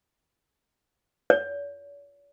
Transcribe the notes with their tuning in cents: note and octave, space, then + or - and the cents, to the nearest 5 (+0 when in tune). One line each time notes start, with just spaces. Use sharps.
C#5 +45